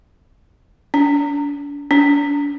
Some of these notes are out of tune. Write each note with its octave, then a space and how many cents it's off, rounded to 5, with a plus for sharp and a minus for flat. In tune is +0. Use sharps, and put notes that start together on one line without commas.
D4 -40
D4 -40